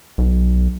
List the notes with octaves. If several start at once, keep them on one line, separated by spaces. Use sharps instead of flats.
B1